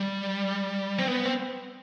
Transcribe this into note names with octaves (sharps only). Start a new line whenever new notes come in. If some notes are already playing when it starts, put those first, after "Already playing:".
Already playing: G3
C4
B3
C4